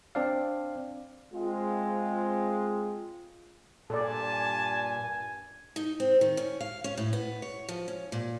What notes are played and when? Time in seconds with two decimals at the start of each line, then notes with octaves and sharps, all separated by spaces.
0.15 C4 D4 D5 F5
1.34 G#3 C4 F4
3.90 G2 A#2 A4 D5 G#5 A5
5.76 D#4
6.00 C4
6.21 D#3
6.37 C#4
6.60 F5
6.84 C#4
6.97 A2
7.13 B3
7.42 C#5
7.69 F3
7.88 C#4
8.12 A#2